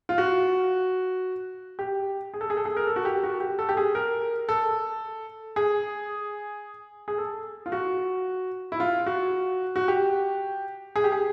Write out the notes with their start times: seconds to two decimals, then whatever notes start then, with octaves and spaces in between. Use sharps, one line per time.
0.09 F4
0.18 F#4
1.79 G4
2.34 G#4
2.41 A4
2.50 G#4
2.57 A4
2.65 G#4
2.77 A#4
2.87 A4
2.96 F#4
3.05 G4
3.24 F#4
3.40 G4
3.59 A4
3.69 G4
3.77 G#4
3.95 A#4
4.49 A4
5.56 G#4
7.08 G#4
7.18 A4
7.66 F4
7.72 F#4
8.72 E4
8.80 F4
9.06 F#4
9.76 F#4
9.88 G4
10.96 G#4
11.04 G4
11.12 G#4